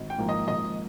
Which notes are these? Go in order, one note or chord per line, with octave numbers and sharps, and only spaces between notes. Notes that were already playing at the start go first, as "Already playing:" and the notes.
Already playing: G#1
G5
G#2 F3 A#3
D#5
G#1 D#5